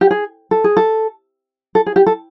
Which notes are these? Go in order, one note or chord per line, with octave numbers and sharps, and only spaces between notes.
G4
G#4
A4
G#4
A4
A4
G#4
G4
A4